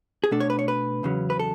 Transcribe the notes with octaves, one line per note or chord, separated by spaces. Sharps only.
G#4
B2 A3 D4 A4
C#5
B4
C#5
B4
E2 C#3 F#3 C#4
B4
A4